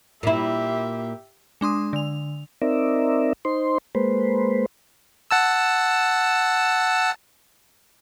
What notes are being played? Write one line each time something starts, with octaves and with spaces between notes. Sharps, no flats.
A#2 E4 G4 E5
G#3 D4 C6 D#6
D3 F7
C4 D#4 A#4 D5 E5
D#4 C5 C6
G#3 A#3 B4 C5
F#5 A5 E6